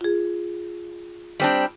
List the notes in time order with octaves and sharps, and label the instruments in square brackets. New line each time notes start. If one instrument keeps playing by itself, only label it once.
[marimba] F4 G#4
[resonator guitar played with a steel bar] G3 C4 D4